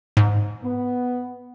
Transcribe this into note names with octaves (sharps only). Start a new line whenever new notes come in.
G#2
B3